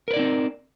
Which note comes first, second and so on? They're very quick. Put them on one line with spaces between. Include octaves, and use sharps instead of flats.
A#4 B4 D5 D#4 C4